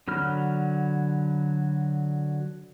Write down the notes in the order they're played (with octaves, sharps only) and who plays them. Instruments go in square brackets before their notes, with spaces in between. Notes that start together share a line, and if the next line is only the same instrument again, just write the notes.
[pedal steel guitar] D3 F#3 B5 F6